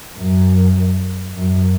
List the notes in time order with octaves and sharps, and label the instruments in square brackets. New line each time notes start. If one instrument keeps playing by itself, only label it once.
[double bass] F#2
F#2